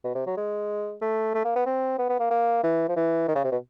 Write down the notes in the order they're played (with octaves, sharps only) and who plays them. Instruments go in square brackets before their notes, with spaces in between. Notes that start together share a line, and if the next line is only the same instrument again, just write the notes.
[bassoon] B2
C3
F#3
G#3
A3
A3
A#3
B3
C4
B3
B3
A#3
A#3
E3
F3
E3
D#3
C#3
C3
B2